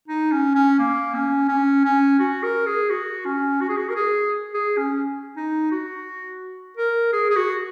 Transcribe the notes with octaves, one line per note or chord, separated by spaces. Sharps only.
D#4
C#4
C#4
A#3
C#4
C#4
C#4
F#4
A#4
G#4
F#4
C#4
F#4
G#4
F#4
A#4
G#4
G#4
C#4
D#4
F#4
A#4
G#4
G#4
F#4